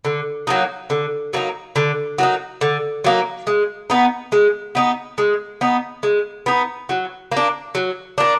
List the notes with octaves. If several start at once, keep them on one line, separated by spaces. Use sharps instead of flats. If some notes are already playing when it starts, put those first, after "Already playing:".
D3
F#3 A#3 D#4
D3
F#3 A#3 D#4
D3
F#3 A#3 D#4
D3
F#3 A#3 D#4
G#3
B3 D#4
G#3
B3 D#4
G#3
B3 D#4
G#3
B3 D#4
F#3
A#3
D4
F#3
A#3 D4